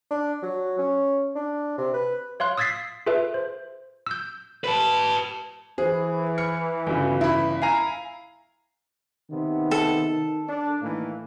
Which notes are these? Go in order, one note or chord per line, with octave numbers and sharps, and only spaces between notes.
D4
F#3
C#4
D4
C3
B4
C#5 F5 C6 F#6
D#6 E6 G#6 A6 B6 C7
F4 G#4 A4 B4 E5
C5
E6 G6
B4 A5
E3 G#4 C5
F6 C#7
G1 C#3 F#4 G#5
E4 E5 B5
F5 G#5 A#5 C7
C3 D#3 B3
A4
D4
A2 D#3 E3 A#3